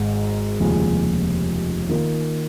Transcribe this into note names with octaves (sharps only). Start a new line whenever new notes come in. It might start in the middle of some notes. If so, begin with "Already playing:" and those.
Already playing: G#1 G#2 G#3
F1 D#2 C#3 F3 G#3
D#3 A#3 F4